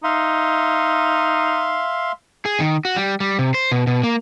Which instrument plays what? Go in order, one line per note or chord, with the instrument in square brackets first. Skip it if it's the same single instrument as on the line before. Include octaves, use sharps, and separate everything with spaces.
[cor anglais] D#4 [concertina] E5 F5 C6
[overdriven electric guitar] G#4
D#3
F#4
G3
G3
C3
C5
B2
B2
A#3